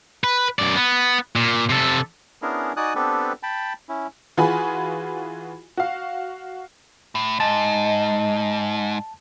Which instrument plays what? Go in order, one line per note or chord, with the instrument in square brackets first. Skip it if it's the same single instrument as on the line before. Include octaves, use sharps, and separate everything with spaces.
[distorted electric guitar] B4
F#2 D5
B3
A#2
C3 A4
[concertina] B3 C#4 D4 E4 G#4 A#4
D#4 F#4 D5 G#5 D#6 F#6
B3 C4 D4 G4 A4 B4
G5 A5 B5
C#4 E4
[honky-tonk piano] E3 F4 F#4 G#4 G#5 B5
F#4 F5
[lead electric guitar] A2
[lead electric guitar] G#2 [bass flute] D#5 [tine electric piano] A5